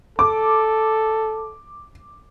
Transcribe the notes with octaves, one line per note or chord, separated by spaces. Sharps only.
A4 D6